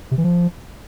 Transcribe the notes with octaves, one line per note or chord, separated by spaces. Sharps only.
C3
E3
F3